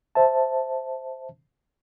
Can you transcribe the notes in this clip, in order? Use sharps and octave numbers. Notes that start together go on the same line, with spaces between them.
C5 E5 A5